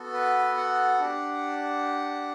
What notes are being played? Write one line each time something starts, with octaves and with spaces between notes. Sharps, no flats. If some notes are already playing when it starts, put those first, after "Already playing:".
Already playing: B3 F#4 A4
B4
F#5
D4 G4